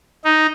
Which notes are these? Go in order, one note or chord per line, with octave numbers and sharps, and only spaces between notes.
D#4